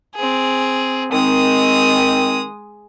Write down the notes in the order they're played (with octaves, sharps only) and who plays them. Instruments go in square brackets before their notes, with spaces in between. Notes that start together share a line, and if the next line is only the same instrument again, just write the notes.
[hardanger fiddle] C4 G#4
[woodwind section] D#3 C4 [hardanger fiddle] G#3 D#6